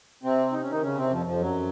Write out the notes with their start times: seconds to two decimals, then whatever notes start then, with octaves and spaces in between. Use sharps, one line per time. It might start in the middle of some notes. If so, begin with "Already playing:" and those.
0.23 C3 C4
0.52 D#4
0.62 C#4
0.71 D#3 D#4
0.82 C#3 C#4
0.96 C3 C4
1.11 F2 F3
1.26 F2 F3
1.40 F#2 F#3